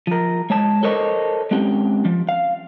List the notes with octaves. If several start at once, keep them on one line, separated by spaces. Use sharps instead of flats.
F3 A#4
G#3 C#5 A5
A4 A#4 C5 C#5 D#5
G#3 C4 C#4 G4
F3
F5